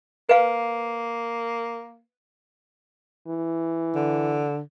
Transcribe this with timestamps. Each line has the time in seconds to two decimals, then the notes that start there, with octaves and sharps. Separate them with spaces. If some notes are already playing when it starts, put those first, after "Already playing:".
0.29 A#3 B4 F5
3.28 E3
3.95 D3